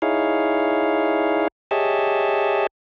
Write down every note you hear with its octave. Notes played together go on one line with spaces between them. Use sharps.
D#4 E4 G#4 C#5 F5
G4 G#4 C#5 D#5 E5 A5